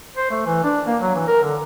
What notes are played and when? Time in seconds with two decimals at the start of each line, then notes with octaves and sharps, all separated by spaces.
0.17 C5
0.31 A3
0.46 E3
0.64 D4
0.87 A#3
1.01 F#3
1.15 E3
1.28 A#4
1.43 D3